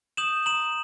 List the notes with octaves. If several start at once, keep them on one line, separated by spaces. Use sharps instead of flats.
D#6 G6 E7 F#7
A#5 E7 F#7